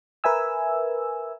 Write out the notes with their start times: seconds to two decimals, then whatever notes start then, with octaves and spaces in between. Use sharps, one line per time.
0.24 A#4 B4 E5 G#5 E6